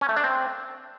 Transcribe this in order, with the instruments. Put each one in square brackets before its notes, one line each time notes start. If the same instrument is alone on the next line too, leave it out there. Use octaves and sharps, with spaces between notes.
[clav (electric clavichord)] C#4
A3
D4
C4